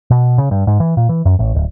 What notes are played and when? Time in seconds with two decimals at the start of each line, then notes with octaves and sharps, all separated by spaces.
0.11 B2
0.38 C#3
0.51 G2
0.67 G#2
0.80 E3
0.97 A#2
1.09 E3
1.25 F#2
1.39 A1
1.55 D1